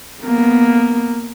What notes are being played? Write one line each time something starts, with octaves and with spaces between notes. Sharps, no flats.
A#3 B3